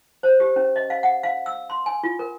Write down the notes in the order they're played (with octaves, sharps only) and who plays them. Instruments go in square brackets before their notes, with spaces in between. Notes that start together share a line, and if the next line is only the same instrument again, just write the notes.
[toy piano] C5
G4
C#4
D#5
F5
F#5
F5
E6
C6
G#5
F4
A#4